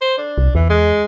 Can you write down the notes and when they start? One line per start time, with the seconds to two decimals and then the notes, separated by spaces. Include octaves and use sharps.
0.01 C5
0.18 D4
0.38 C2
0.55 E2 E3
0.70 G#3